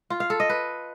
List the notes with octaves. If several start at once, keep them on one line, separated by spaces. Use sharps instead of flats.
F4
F5
A4
D#5
B4